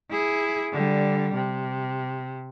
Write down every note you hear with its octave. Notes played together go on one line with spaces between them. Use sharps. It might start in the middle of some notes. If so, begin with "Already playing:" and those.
E4 G#4
D3 G3
C3